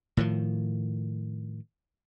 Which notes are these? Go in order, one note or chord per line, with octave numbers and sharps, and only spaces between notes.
A2 D#3 F3